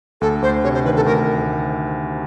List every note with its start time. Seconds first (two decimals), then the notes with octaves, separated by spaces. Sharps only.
0.21 D2 A4
0.42 D2 C5
0.64 C3 C#5
0.74 C5
0.85 D#3 B4
0.96 A4
1.06 D2 A#4